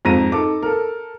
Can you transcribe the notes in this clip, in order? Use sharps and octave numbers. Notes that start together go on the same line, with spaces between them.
F2 G#2 A#5 A#6 D#7
D#4 A4 D6
A4 A#4